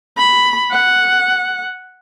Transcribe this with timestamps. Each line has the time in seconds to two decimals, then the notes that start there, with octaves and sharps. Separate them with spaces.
0.18 B5
0.71 F#5